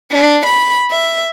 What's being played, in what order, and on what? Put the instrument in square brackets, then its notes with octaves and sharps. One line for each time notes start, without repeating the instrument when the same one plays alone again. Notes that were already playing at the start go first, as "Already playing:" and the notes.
[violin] D4
B5
E5